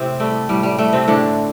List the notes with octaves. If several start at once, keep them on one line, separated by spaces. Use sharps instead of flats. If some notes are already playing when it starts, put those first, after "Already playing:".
Already playing: A2 C3 C4
G3 A3
A2 G3
G3
G3 A3
C3 C4
A2 D3 D4